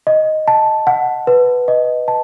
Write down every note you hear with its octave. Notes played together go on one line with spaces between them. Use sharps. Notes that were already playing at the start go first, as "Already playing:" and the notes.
D#5
A5
F#5
B4
D#5
A5